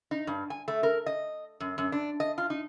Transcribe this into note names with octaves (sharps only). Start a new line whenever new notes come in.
D#4
G2
G#5
A3
A#4
D#5
F#2
F#2
D4
D#5
F4
D#4